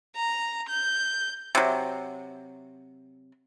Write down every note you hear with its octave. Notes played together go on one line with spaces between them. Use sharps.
A#5
G6
C3 F#3